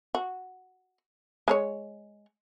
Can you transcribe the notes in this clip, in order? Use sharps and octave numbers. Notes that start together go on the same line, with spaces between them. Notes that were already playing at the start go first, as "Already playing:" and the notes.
F#4
G#3 A#4 C#5